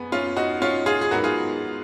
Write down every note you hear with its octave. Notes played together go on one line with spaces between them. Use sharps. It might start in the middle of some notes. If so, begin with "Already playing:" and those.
Already playing: F#2 G#3 B3
C#4 F4
D#4 F#4
C#4 F4
F4 G#4
G#4
G#2 F#3 B3 F#4 A#4
F4 G#4